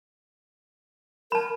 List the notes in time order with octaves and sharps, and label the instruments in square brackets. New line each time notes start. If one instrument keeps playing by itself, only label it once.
[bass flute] A#4 [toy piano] A5 B5